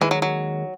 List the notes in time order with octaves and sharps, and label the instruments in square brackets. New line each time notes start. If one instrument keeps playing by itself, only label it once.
[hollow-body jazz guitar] D#2 D#3 G#3 [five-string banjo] E3
[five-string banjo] F#3
F#3